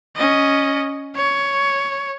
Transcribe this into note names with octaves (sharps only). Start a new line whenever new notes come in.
C#4 D#5
C#5